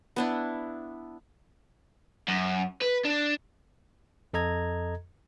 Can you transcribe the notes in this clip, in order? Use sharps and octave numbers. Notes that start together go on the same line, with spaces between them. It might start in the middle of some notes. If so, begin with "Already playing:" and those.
B3 D4 E4
F#2
B4
D4
F2 A4 D#5 A#5 G#6